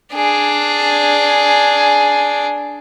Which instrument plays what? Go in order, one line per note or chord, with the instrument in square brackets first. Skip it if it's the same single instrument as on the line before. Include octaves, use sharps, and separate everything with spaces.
[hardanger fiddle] D4 G#4